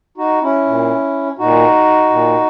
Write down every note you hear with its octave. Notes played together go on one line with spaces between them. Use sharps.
D#4 F#4
C#4 E4
A#2
A#2 D#4 F#4
A#2